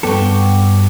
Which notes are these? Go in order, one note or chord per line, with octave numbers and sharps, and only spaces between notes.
G2 B3 F#4 G4 A4